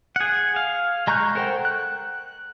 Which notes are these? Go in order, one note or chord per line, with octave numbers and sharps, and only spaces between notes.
G#4 F#5
F5
G#3 A#5 C#6 F#6 G6
A4 A#4 C5 F#5 G5
F#6